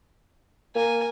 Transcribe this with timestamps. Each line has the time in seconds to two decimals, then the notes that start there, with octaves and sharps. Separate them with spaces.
0.76 A#3 A#4 G#5